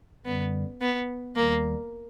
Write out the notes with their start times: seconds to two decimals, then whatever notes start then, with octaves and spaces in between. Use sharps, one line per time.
0.25 F#2 D3 G3 B3
0.81 B3
1.36 D#2 D#3 G3 A#3